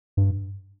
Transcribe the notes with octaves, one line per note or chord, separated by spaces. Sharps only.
G2